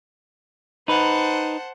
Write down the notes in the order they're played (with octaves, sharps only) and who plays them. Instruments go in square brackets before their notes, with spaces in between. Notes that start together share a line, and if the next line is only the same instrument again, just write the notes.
[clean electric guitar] D#4 B4 [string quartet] C5 F#5 A5